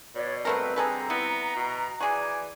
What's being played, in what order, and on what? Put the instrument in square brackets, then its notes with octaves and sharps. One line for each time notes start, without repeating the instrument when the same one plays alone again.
[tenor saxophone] B2 [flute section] C#5 D5
[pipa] F#3 A3 A#4 [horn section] G3 C4 [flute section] B4
[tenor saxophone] D3 [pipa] G#4 A4 B4 [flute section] A#5
[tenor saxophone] B3 [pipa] E4
[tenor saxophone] B2
[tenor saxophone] E3 [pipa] F#4 G#4 [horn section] D5 G#5